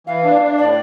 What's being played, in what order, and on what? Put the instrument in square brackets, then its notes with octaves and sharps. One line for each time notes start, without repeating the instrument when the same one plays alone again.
[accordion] E3 [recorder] F5
[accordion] D4
D4
[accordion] A2 [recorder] D5